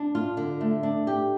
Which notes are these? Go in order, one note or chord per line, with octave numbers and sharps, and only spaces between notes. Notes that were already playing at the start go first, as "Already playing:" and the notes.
Already playing: D4
F4
D3
A3
D4
G4